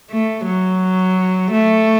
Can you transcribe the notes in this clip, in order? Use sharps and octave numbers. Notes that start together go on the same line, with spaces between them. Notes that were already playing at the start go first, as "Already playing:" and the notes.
A3
F#3
A3